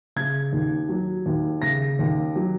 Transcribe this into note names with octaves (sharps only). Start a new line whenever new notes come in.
C#3 G#6
D#2
F#3
D#2
C#3 A#6
D#2
F#3